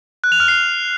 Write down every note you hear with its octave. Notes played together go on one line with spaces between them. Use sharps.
F#6
F7
F6
C7